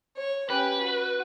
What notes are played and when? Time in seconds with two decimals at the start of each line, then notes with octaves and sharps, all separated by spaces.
0.17 C#5
0.50 C#4 G4 B4
0.80 F#4